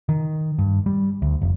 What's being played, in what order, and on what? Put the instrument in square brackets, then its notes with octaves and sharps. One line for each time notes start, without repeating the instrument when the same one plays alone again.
[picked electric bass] D#3
G2
G3
D2
F1